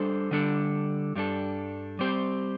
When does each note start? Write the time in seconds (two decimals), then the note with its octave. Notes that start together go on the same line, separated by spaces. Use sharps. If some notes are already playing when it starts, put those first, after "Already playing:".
Already playing: G3 D4 A4 C5
0.31 D3 G3 D4 A4
1.15 G2 G3 D4 A4
1.99 G3 C4 G4 C5